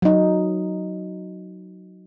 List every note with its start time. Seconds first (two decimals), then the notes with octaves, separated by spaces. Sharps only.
0.02 F#3 D#4